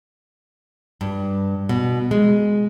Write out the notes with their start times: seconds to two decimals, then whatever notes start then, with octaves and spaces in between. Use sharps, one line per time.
1.01 G2
1.69 B2
2.11 G#3